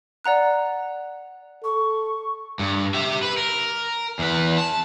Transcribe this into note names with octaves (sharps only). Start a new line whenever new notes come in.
D5 F#5 A#5 F#6
A4 C#6
G2
G4 E5
B4
A#4
E2 B4
A5